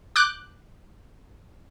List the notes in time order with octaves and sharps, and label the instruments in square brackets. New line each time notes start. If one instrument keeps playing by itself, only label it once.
[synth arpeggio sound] D6 F#6 G6